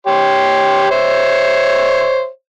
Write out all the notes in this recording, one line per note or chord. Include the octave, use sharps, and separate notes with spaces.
G4 C#5 C6
C5 C#5 E5